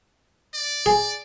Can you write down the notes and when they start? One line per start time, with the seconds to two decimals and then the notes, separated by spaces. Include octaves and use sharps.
0.54 D5
0.86 G#4